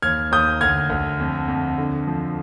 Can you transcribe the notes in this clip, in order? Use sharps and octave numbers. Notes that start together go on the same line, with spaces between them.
D#2 F6 G#6
D#2 D#6 G6
D2 F6 G#6
D2
F2
F2
D3
F3